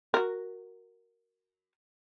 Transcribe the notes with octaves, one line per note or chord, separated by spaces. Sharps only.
F#4 A#4